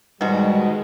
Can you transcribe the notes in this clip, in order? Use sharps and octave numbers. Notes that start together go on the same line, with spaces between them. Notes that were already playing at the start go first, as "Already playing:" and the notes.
G#2 B2 D#3 G3 G#3 F#4